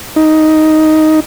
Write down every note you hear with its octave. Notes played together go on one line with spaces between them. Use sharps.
D#4